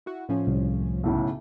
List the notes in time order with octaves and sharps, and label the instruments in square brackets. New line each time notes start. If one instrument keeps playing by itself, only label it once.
[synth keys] E4 F#4
A2 F3 C#4
[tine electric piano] C2
[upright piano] B1 A2 C#3